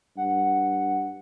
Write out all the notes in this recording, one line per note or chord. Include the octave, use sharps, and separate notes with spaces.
G2 F#5